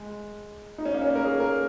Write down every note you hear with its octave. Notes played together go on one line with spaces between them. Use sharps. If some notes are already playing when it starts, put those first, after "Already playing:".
Already playing: G#3
D#4
C#4
A#3
C#4
A#4
G#4
A#4